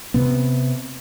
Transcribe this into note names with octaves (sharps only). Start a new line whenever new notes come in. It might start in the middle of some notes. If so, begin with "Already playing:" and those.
C3 B3